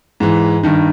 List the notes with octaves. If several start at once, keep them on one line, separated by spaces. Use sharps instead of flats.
G#2 E3
G2 D#3